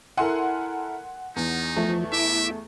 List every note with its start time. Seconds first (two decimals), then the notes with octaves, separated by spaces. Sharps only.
0.17 E4 A4 A#4 F#5 G#5 C6
1.36 E2 D#4
1.77 F3 A3
2.12 E4 E5 D6